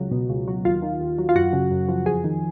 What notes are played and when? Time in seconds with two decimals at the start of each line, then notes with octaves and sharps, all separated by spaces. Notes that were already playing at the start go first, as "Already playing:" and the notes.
Already playing: C#2 F#3
0.11 B2
0.29 C#2
0.48 F#3
0.65 D#2 F4
0.82 D#3
1.01 D#2
1.18 F#3
1.29 F4
1.36 F#2 F#4
1.53 C#3
1.71 F#2
1.89 F3
2.06 F2 G#4
2.24 D#3